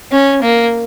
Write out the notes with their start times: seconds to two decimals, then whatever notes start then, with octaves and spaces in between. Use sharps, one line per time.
0.12 C#4
0.42 A#3